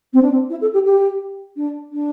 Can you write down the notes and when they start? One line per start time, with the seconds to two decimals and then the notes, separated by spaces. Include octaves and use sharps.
0.13 C4
0.21 D4
0.31 C4
0.49 E4
0.61 A4
0.73 G4
0.85 G4
1.56 D4
1.92 D4